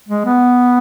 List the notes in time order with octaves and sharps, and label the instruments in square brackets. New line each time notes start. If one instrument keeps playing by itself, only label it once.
[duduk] G#3
B3